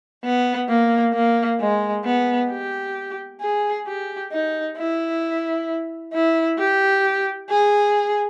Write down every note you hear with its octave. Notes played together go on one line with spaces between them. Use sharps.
B3
A#3
A#3
G#3
B3
G4
G#4
G4
D#4
E4
E4
G4
G#4